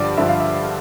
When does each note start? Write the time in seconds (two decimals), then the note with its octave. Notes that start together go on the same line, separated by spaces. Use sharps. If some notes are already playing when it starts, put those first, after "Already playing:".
Already playing: G2 D3 F3 D5
0.17 G2 D3 F3 E5
0.28 F5
0.40 E5